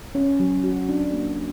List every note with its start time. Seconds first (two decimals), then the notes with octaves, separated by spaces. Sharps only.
0.15 C#4
0.40 F#3
0.64 F#4
0.89 D4
1.13 A#3